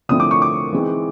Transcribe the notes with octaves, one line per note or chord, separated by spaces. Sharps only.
D3 F3 A3 C4 E4 D#6
D6
C#6
D6
E3 G#3 C4 D#4